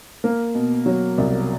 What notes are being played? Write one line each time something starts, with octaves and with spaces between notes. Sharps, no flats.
A#3
B2
F#3
C2